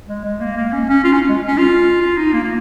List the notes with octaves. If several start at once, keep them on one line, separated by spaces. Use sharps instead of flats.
G#3
G#3
A#3
A#3
C#4
C#4
F4
C#4
G#3
C#4
F4
F4
D#4
A#3
A#3